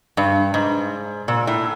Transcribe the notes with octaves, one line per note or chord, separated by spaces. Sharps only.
G2
G#2
A#2
A2